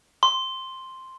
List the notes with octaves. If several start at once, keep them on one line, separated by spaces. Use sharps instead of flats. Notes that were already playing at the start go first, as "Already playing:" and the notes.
C6